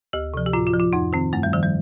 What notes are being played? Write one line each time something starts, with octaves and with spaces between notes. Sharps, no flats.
D2 G4
C3 F3
G4
A2 F4
F4
F3
F4
F2 D#4
D#3 C4
G2 A3
G3
D#3 F3
G3